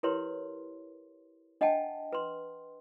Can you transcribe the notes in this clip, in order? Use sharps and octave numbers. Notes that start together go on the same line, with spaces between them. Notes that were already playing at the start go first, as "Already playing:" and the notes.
E4 G4 A#4 B4 C#5 C6
D4 D#5 F#5 G5 A5
B4 C6